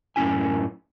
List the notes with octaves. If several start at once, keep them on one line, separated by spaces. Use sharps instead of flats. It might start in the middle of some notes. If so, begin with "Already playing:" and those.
F#2 A2 C#4 E4 G#5